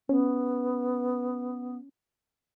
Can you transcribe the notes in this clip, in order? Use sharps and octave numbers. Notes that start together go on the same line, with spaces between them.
B3 C#4